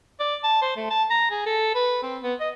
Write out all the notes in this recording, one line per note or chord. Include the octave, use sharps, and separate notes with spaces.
D5
A5
C5
A3
A5
A#5
G#4
A4
B4
C4
B3
D#5